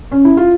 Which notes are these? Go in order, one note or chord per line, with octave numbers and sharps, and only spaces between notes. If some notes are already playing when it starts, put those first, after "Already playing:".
C#4
E4
F4